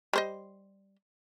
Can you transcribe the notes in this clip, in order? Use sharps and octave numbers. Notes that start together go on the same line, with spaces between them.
G3 C5 D#5